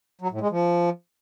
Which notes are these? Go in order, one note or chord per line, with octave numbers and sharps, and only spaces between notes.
F#3
A2
G#3
F3